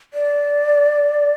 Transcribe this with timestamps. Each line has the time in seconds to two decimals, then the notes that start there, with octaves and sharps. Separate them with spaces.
0.14 D5